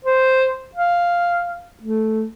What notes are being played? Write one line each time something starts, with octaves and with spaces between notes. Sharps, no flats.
C5
F5
A3